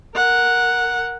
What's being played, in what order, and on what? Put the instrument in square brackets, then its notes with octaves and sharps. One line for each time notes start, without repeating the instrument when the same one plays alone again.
[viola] A#4 F#5